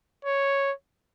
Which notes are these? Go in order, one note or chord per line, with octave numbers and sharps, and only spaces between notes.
C#5